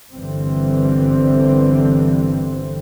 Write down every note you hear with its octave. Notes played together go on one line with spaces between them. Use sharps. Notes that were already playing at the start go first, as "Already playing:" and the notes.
G1 D3 E3 G3 C4